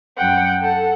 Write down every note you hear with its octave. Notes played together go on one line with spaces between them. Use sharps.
F#2 F#5 G5
A4 F#5